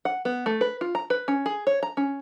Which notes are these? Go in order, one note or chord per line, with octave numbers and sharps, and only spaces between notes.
F#5
B3
A3
B4
F4
A#5
B4
C#4
G#4
C#5
A#5
C#4